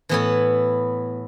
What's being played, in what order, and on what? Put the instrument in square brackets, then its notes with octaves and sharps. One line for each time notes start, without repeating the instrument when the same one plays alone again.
[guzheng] A2 E3 B3 E4